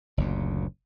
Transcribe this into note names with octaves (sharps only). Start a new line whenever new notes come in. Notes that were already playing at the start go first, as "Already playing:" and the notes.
F#1 D2 A#2